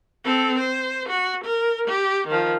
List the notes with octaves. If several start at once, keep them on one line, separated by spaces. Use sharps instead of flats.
C4 A4
C5
F#4
A#4
G4
D#3 F3